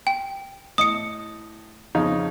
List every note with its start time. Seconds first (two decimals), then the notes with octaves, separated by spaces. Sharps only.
0.07 G5
0.78 A2 D#5 D#6 C#7
1.95 F2 C#3 D#4